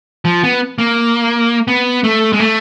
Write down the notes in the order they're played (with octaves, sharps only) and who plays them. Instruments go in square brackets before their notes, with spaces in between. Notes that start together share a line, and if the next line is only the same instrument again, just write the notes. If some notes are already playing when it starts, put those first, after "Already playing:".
[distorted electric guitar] F3
B3
A#3
B3
A3
G#3
A3